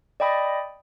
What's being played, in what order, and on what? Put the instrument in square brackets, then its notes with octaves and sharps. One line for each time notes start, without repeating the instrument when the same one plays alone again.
[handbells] D5 D#5 G5 B5 D#6